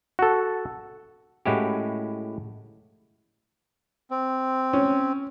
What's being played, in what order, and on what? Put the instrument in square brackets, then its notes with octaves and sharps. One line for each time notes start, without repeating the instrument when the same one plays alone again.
[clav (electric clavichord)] F#4 A4
A2 G#3 C#4 E4 F#4 G4
[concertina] C4
[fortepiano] C#4